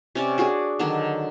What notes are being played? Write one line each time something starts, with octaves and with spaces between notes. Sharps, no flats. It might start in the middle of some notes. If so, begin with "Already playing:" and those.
C3 C#4 D5
D4 F#4 G#4 D5
D3 D#3 F#3 D4